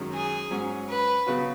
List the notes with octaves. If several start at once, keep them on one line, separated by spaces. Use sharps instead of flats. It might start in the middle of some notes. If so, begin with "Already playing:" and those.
Already playing: F#2 D#3 G#3 C#4
G#4
G#2 F#3 C#4
B4
C#3 F#3 B3 F#4